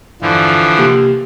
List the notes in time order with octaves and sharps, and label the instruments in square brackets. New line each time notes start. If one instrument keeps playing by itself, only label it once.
[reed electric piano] E2 G2 [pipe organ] D3 E3 F3
[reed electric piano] C3 A#3 G4